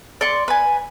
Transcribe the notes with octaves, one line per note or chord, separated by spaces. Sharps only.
D5 C6 C#6
B4 G#5